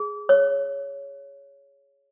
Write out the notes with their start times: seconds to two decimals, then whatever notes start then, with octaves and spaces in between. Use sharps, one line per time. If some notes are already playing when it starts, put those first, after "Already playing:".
Already playing: G#4
0.29 C#5